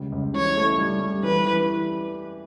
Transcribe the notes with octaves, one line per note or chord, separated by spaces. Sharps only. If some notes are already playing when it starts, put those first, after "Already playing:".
Already playing: C#2 G3
C#2
E3 C#5
A3
G3
G3
E3 B4
E3